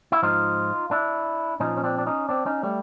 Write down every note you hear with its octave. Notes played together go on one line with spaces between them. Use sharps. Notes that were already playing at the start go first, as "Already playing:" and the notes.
E4
G#2 F3 D#4 F4
D4 E4
A#2 F3 C#4 D#4
C#4
C4 D4
D4
C#4 D#4
C4 D4
C#4 D#4
G3 A3